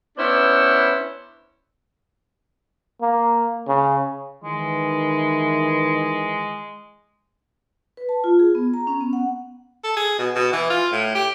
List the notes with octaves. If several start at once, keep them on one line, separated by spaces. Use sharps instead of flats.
B3 C#4 D4 E4 C5
A#3
C#3
D#3 E3 G#3
B4
A5
F4
G#4
B3
A#5
C#4
B3
F#5
A4
G#4
B2
B2
E3
F4
A2
G4